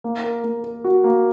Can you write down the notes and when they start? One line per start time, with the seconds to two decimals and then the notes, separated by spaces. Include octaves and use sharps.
0.04 A#3
0.24 A#4
0.44 A#3
0.64 A#4
0.84 F#4
1.04 A#3